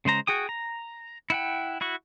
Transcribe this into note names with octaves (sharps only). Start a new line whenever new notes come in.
C#3 G#3 C5 A#5
F#4 G#4 G5 D#6
A#5
E4 F#5 G5
E4 F#4 C#6